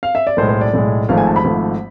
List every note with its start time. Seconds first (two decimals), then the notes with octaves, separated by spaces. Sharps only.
0.03 F5
0.15 E5
0.27 D5
0.37 B1 A2 G#3 C5
0.49 C5
0.61 D5
0.74 B1 A2 G#3
1.09 G#1 G#2 F3 A3 F5
1.18 G#5
1.27 A5
1.36 B5
1.44 G#1 G#2 F3 A3